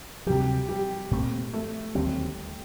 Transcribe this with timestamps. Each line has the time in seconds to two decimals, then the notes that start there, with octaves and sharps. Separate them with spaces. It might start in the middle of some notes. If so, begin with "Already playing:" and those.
0.26 D2 C3 F#3 G3 G4
0.69 G3 G4
1.11 A#2 A3 C4
1.53 A3 A4
1.94 D#2 D3 F#3 G3 C4 G4